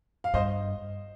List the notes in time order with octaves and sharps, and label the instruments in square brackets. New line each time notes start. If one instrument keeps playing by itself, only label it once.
[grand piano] F5
[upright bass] G2 [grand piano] C5 D#5